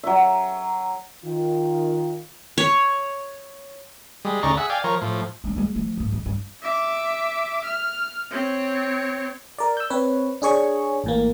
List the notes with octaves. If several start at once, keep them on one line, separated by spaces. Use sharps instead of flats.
F#3 E5
D#3 F4
C#5
G3 G#3
D2 C#3 D#4 D5 A#5 C#6
G#4 E5 F#5
D5 F5 G5 G#5
F3 A#4 C#5
A2 F3
G#3 D4
G3 G#3
F3 A3
A#1 G#2
F2
G2
E5 D6
F6
C4 C#5
A#4 D5
E6 G6
C4 B4 C#5
D4 G#4 C#5 C#6
A1 A2 A#3